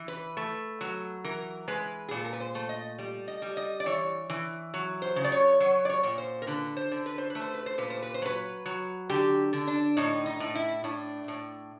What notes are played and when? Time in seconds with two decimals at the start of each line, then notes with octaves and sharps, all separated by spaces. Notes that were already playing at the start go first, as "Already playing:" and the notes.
Already playing: E3
0.08 B4
0.37 A3
0.81 F#3
1.24 E3 A#4
1.68 G#3 B4
2.09 A#2 G#4
2.17 A4
2.25 A#4
2.33 B4
2.40 C5
2.55 A3
2.69 D#5
2.99 G3
3.28 D#5
3.42 G3
3.57 D#5
3.80 D5
3.86 E3 C#5
4.30 E3
4.74 F#3
5.02 C5
5.16 C#3
5.24 D5
5.32 C#5
5.60 F#3 C#5
5.85 D5
5.90 C#5
6.04 A#2
6.18 C5
6.42 A#4
6.47 D3 B4
6.77 C5
6.92 D3
7.06 B4
7.18 C5
7.30 B4
7.35 A3
7.41 C5
7.54 B4
7.66 C5
7.78 A#2 B4
7.90 C5
8.03 B4
8.14 C5
8.22 F#3 B4
8.66 F#3
9.10 D3 G4
9.53 D3
9.67 D4
9.97 A2 D#4
10.26 D#4
10.40 A2
10.55 E4
10.84 A2 D4
11.28 A2